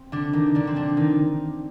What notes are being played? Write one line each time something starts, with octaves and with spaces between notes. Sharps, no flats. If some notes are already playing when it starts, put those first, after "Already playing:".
Already playing: C4
D3 D4
D#3 D#4
D3 D4
C4
D3 D4
D#3 D#4